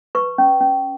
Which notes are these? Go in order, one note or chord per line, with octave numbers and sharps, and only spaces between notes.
B4 C#6
C#4
C#4